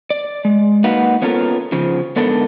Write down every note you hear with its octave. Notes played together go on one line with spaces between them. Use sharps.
D5
G#3
A#3 D#4 F#4 B4 F5 F#5
B3 C#4 F4 A4 A#4
C#3 F3
G#2 D3 B3 D4 A4 A#4